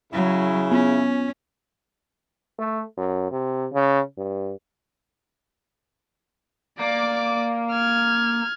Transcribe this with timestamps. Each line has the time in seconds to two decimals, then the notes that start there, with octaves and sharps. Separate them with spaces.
0.13 C#3 F#3 E4
0.72 B3 C#4
2.58 A3
2.97 F#2
3.31 C3
3.72 C#3
4.18 G2
6.79 A#3 D5 D6
7.72 F6 G#6